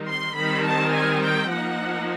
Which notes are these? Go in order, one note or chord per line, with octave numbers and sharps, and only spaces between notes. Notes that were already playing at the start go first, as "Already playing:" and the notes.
Already playing: D#3 G3 C4 D#4
C6
D#3 G3 C4 B5
A5
G#5
G5
F3 A#3 D#4 F#5